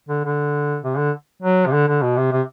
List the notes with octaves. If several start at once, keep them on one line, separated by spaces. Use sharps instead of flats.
D3
D3
C3
D3
F#3
C3
D3
D3
B2
C3
C3